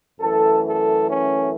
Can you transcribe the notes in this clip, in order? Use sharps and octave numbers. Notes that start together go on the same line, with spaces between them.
F#2 E3 A3 A4
A4
C#4